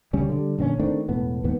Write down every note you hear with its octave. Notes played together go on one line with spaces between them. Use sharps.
D2 C#3 G3 C#4
D3 G3
A#1 D3 C4 C#4
D#3 A3 C4 D4
E1 A2 B3
D#2 G#2 B3